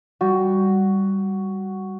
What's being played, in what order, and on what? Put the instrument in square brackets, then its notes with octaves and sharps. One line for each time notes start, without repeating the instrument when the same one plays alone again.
[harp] G3 [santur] F#4